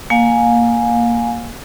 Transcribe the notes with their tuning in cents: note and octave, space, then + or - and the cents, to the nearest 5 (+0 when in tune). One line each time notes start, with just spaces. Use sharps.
A#3 +0 F5 +30 G#5 +0